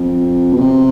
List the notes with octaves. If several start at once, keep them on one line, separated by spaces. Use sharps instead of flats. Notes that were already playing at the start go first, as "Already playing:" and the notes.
Already playing: F2
B2
C3